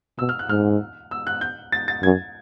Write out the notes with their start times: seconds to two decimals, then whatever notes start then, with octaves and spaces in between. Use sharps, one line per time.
0.19 B2 E6
0.29 F6
0.39 F#6
0.49 G#2 F6
1.11 E6
1.27 F#6
1.41 G6
1.72 A6
1.88 A6
2.03 F#2 G#6